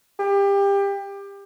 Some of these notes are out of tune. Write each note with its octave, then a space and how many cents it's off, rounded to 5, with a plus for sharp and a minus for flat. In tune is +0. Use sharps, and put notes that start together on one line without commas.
G4 +25